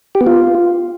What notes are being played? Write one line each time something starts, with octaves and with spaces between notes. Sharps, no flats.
G4
B3
F4